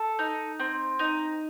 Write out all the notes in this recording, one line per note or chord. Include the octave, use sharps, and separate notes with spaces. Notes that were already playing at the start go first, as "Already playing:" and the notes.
Already playing: A4
D#4
C4
D#4